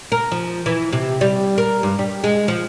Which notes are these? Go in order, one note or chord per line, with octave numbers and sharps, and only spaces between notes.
A#4
F3
E3
C3
G3
A#4
G2
G3
G#3
F3